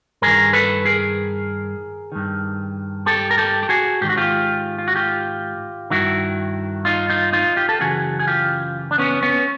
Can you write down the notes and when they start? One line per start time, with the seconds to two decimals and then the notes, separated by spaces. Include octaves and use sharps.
0.22 G2 D#3 G#4 A#4
0.53 A4 B4
0.85 G#4 A#4
2.12 G2 D#3
3.06 G4 A4
3.31 A#4
3.38 G4 A4
3.63 G4
3.69 F#4 G#4
4.01 G#2 D#3 G4
4.09 F#4
4.17 F4 G4
4.78 F4
4.88 F#4
4.95 F4 G4
5.90 G2 D#3 E4 F#4
6.85 D#4 F4
7.09 D#4 F4
7.32 D#4 F4
7.56 F4 G4
7.69 A4
7.79 F#2 C#3 E3 F#4 G#4
8.19 G#4
8.27 F4 G4
8.91 D4
8.98 B3 C#4
9.23 B3 C#4